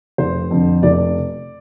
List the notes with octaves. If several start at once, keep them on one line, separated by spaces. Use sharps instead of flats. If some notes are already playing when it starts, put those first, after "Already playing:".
F1 C5
F2 D3
F1 D5